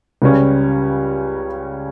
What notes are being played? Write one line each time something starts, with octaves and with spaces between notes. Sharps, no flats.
C#2 C#3 G3 C#4